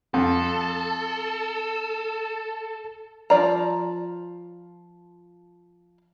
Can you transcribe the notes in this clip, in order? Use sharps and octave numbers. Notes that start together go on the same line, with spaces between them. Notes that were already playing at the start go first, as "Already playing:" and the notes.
F2 A4
F3 D5 A#5